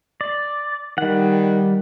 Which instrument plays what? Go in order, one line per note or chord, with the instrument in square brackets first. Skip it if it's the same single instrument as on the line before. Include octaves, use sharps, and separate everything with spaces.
[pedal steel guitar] D5
[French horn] D#3 [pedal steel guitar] G3 F#5